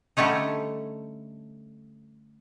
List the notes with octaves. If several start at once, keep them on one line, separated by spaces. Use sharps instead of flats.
D3 G3 A3 C#4 D#4